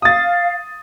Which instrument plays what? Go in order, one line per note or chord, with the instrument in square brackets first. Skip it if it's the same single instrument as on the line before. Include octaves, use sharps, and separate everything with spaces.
[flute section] F5 [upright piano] D#6 A6